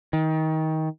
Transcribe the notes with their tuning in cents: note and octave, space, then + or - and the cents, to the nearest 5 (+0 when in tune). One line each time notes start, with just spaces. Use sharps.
D#3 +25